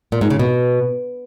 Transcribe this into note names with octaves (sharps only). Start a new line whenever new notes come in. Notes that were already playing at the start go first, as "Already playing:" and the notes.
A#2
G#2
C#3
B2